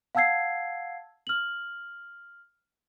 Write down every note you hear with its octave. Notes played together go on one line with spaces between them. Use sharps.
F5 F#5 A5 E6 G#6 C7
F6 F#7